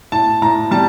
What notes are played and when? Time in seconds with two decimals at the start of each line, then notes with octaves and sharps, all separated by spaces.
0.12 A2 A5
0.42 A2 A#5
0.71 G3 A5